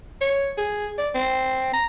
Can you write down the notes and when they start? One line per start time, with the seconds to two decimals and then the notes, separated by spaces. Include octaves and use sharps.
0.21 C#5
0.58 G#4
0.98 D5
1.15 C4
1.73 A#5